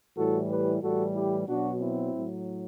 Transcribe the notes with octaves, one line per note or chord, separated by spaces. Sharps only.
A2 E3 G3 F#4 A4
G4 B4
A2 E3 G3 F#4 A4
E4 G4
B2 F#3 D4 F#4
C4 E4
A2 F#3